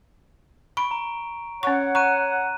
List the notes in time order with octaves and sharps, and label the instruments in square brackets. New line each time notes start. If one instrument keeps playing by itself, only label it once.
[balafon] B5 [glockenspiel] C#6 D7
[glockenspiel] A#5
[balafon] C#4 C#6 [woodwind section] C#5 F#5
[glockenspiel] A#5 F#6 D#7 [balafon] C#6